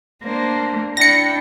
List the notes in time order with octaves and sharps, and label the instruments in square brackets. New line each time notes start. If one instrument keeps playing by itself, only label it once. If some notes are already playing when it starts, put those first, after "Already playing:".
[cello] A#3 [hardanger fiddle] D4 C5
[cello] D4 [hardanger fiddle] E4 G5 [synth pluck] A#6 C#7